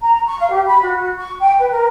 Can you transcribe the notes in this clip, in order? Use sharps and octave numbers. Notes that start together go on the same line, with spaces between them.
A#5
C#6
F5
G4
B5
F#4
C#6
G5
B4
A#4